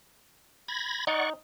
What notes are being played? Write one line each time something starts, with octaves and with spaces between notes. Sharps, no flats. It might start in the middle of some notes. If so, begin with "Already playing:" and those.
B5 G#6 A#6
D#4 D5 F#5 C#6